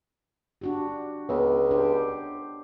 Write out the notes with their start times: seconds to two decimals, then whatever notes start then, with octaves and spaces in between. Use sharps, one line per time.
0.61 D4 F#4 G4
1.29 C#2 B3 A#4
1.71 D4 G4 C5